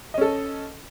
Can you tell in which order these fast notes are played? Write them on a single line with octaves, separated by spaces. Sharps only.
D#5 C#4 A4